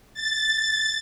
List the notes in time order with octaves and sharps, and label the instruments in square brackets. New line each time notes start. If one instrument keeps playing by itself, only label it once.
[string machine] A6